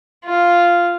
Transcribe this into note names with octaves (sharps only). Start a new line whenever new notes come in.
F4